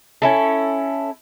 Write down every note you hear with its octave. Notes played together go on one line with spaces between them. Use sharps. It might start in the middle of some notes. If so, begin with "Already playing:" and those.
C#4 E4 A4